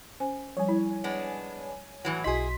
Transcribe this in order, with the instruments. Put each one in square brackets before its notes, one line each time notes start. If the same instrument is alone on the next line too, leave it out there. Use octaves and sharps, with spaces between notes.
[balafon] C#4 C5 G#5
[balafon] F3 G3 [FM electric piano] C#5 G#5
[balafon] G3 E4
[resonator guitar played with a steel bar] G#3 B3 D4
A2 E3 F#3
[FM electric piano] B1 C6 B6 [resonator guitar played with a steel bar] E4 G#4 [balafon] F#4 D#5